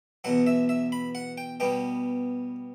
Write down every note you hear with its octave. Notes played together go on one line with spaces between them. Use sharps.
E2 B2 F#3 F#5
E5
E5
B5
F#5
G5
B2 G3 B3 G5